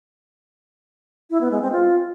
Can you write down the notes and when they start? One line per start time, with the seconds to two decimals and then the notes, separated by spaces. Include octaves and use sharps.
1.30 E4
1.41 B3
1.51 G#3
1.62 C4
1.72 F4